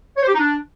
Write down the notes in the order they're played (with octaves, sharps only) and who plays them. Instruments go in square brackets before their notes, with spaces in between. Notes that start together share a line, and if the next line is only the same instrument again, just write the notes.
[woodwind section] C#5
C5
G4
D#4
D4